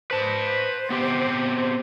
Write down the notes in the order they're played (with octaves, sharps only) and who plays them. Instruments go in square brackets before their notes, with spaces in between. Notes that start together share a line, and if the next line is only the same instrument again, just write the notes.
[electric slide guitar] B4 A5 [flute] C5
[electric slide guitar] B3 C4 G4